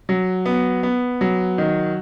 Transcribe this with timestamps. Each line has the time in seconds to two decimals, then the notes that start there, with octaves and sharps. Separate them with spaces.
0.09 F#3
0.46 B3
0.83 B3
1.21 F#3
1.58 D#3